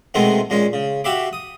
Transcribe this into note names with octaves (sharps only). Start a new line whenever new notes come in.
B2 D#3 G#3 A3 B3 C4
A#2 G#3 C#4
C#3
F#4 G4 E5 F5 B5 D6
D#6